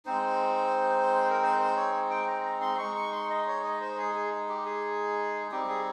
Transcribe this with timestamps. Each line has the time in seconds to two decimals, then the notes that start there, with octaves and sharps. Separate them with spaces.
0.06 G#3 C4 D#4 C5
1.30 A#4
1.43 C5
1.59 C5
1.76 C#5
2.10 G5
2.27 A#5
2.44 A#5
2.61 C6
2.78 G#3 D#4 C#6
2.95 C#6
3.12 C6
3.30 D#5
3.47 C#5
3.64 D#5
3.81 C5
3.98 G#4
4.15 G#4
4.49 G4
4.66 G#4
5.52 G3 C4 D#4 G4
5.68 G#4